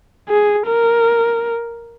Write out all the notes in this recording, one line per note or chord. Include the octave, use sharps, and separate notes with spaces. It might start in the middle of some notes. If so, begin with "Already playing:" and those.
G#4
A#4